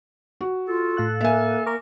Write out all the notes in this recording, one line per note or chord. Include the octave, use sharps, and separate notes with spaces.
F#4
F4 A4
A2 F5 F#6
A#3 E5 G#5
A#4 A#5 C#6 D6